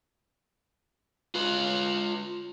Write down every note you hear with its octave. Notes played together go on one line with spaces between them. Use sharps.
F4 B4